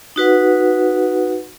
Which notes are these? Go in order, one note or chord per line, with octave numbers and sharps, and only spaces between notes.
D#4 F#4 B4 F#5